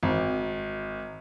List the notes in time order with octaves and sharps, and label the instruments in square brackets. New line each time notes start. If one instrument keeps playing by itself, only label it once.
[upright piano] G#1